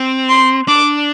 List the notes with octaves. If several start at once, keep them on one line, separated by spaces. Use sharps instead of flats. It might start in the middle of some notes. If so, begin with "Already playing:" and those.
Already playing: C4
C6
D4 D6